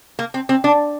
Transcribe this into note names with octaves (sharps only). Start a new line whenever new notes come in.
A#3
C4
C4
D4